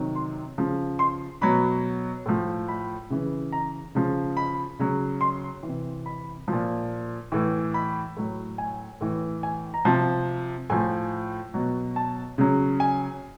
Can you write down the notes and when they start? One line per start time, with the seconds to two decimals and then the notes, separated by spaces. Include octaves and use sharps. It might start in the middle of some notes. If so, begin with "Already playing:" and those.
Already playing: C3 D#3 F#3
0.15 C6
0.58 C#3 F3
0.99 C6
1.41 B2 F#3 B5
2.26 A2 F3
2.68 B5
3.10 C#3 E3
3.52 A#5
3.95 C#3 F3
4.37 B5
4.79 C#3 F#3
5.21 C6
5.63 E3
5.68 C3
6.06 B5
6.48 A#2 F3
7.32 A2 E3
7.74 B5
8.17 A2 F#3
8.58 G#5
9.01 A2 E3
9.43 G#5
9.74 A#5
9.85 C3 F3 A5
10.70 A2 F3 G#5
11.54 B2 F#3
11.96 A5
12.38 C#3 F#3
12.80 G#5